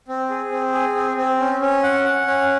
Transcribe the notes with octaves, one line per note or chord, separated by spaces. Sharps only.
C4
G#4
C4
G#4
C4
C4
C#4
C#4
F#5
F#5
C#4